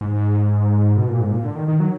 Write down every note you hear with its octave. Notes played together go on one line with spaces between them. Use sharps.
G#2
B2
A#2
G#2
A#2
D3
D#3
D#3
F#3